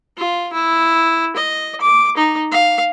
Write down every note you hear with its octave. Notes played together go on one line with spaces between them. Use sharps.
F4
E4
D#5
D6
D#4
F5